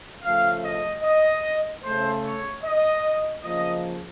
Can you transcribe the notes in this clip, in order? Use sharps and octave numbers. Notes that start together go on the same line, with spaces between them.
C#3 F3 A3 F5
D#5
D#5
C#3 A3 C5
C#5
D#5
C#3 F3 A#3 D#5